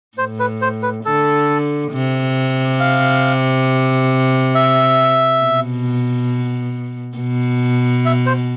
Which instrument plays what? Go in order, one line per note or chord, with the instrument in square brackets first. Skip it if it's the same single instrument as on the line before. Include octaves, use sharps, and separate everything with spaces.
[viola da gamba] A2 [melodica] C5
[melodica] B4
C5
B4
[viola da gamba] D3 [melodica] A4
[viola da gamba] C3
[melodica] F5
E5
[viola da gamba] B2
B2
[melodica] E5
C5